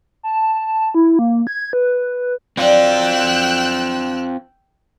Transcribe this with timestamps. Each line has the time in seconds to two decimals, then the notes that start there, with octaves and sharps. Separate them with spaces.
0.23 A5
0.95 E4
1.19 A#3
1.47 G#6
1.73 B4
2.57 D3 F#3 C4 F4 D5 G5 E6 F#6